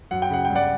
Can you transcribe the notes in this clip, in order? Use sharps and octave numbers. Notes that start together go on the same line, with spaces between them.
F#2 F#5
G5
C#3 F#5
G5
G2
D5 F#5